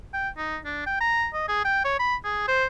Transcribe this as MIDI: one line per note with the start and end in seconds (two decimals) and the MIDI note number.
0.14 0.29 79
0.37 0.58 63
0.65 0.84 62
0.87 0.97 79
1.01 1.28 82
1.34 1.47 75
1.48 1.61 68
1.65 1.82 79
1.85 1.97 73
1.99 2.15 83
2.24 2.48 68
2.48 2.66 72